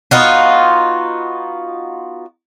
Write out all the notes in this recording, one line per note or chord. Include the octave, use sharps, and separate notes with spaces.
B3 D#4 F4 F#4